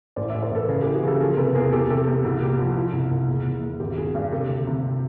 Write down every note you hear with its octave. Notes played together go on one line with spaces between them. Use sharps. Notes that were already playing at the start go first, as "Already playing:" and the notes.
A1 C5 D5
D5 E5
A1
A#4 C5
A1 A4 B4
C#3 G#4 A#4
G4 A4
E3
F#4 G#4
C#3 G4 A4
F3 G#4 A#4
C3 A4 B4
E2 G#4 A#4
E2 G4 A4
C3 G4 A4
E2 G4
C2 F#4 G#4
A#2 G4
F3 F#4
F3
C2
C2
E1
E1
E1
G#1 G4
G#1 F#4 G#4
G2
C3 G4 A4
D2
C3